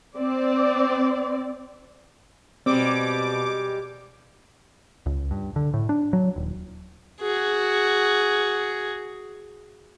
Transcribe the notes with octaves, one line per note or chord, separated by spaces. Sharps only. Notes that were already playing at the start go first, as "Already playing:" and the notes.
C4 D5
B2 G3 G#3 C4 D6
C#2
G2
D3
A2
D4
F#3
D#1
F#4 G#4